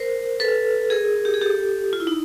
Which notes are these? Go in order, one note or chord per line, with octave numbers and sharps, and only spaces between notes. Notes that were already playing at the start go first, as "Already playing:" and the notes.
Already playing: A#4 C5
A4 B4
G#4 A#4
G4
G#4
G4 A4
F4
E4
D#4